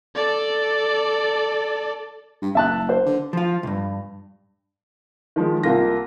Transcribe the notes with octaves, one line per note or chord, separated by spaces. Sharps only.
A4 D5
G2
F#1 E5 A5 F#6
C5
D3
F3 F4
B1 G2
D#3 F3 G#3
C2 A#3 F4 A#6